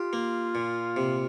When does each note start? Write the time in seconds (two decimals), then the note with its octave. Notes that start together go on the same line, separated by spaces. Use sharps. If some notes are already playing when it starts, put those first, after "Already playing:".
Already playing: F4 G4
0.13 A#3
0.55 A#2
0.96 C3